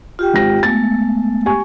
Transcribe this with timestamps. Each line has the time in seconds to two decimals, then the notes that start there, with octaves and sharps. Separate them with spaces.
0.19 F4 G4 G5
0.34 G#1 A#6
0.63 G#3 A3 B3 A6
1.46 G4 G#5 C#6